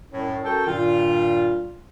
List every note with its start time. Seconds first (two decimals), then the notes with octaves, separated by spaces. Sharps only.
0.11 C2 F#2 A2
0.44 C#4 F#4 A4 A#4 G5
0.66 G2 A#2 D#3 G3 F4